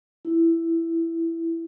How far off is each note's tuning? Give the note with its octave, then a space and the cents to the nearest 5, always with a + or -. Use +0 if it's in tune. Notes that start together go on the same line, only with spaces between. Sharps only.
E4 +10